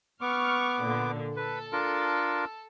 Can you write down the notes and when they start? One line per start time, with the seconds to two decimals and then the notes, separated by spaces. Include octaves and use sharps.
0.21 B3 C#6 D6 F6
0.82 A#2 D3
1.36 A4 B4
1.72 D4 F4 A#4